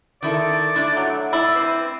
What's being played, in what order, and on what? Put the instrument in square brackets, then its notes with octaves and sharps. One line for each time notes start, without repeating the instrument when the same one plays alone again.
[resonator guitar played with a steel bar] D#3 E4 A4 [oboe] D5
[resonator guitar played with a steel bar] A3 D4 E4
[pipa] F#3
[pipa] E4 [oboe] D5
[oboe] C4 [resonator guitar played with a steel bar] B4